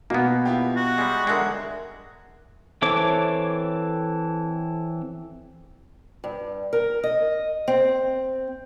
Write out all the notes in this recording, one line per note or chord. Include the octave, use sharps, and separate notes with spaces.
B2 A#3 B3
E4 F4 G4
F#4
G3 G#3
D3 G#3 A#4 E5 F#5
E3 C4 A4 C#5 D6
G2
A#4
D#5
C4